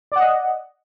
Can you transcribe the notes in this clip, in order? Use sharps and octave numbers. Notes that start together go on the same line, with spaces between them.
D5 D#5 F#5